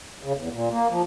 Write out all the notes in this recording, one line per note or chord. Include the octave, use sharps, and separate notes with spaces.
C#3
E2
A#2
A#3
F3